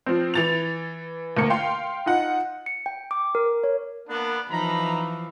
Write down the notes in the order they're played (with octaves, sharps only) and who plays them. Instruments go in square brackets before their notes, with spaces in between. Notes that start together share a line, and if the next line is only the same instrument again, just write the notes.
[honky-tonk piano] F3 C4
E3 A6 F7
D2 A#3 C#7
F5 G5 C6
D#4 F4 F#5
[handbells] C#7
G5
D6
A#4
C#5
[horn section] A#3 B3 D4
[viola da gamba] E3 F3 [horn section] D#4 A#5 B5